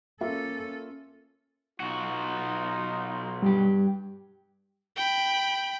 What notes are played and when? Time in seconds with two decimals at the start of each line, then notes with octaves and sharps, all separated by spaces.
0.21 A#3 C#4 F4 A4 E5
1.80 B1 D#4 F4 F#4
3.43 G2 G3 G4
4.96 G5 B5